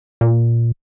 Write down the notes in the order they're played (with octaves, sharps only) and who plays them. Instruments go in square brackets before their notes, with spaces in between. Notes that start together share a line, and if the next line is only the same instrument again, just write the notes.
[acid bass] A#2